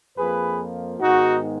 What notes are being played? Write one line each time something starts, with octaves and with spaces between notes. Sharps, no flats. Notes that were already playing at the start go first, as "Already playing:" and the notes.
F2 F3 A#3 G#4 B4
G#2 D#3 G#3 B3 D#4 F#4